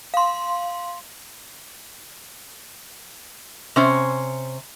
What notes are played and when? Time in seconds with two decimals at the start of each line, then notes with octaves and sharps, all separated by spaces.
0.14 F5 C6
3.76 C3 C#4 C5